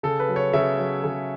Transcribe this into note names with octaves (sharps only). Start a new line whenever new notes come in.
C#3 A4
B4
F#3
C#5
C#3 E5
F#3
C#3